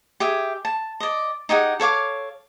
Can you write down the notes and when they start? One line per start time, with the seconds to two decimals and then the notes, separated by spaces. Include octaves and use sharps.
0.20 G4 G#4 E5
0.65 A5
1.00 D5 D#5
1.49 D#4 G4 G#4 F#5
1.80 A4 C#5 F5 D6